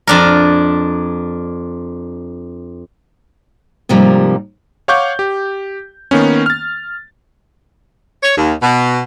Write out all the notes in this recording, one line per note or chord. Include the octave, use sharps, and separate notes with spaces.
F2 D4 A#4
G#2 C3 F3 G3 A#3
C#5 F5 F#5 C#6 D6 G6
G4
D#3 A#3 B3 C#4
F6 A6
C#5
D#2
B2